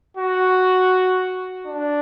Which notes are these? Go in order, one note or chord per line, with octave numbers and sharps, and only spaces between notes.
F#4
D4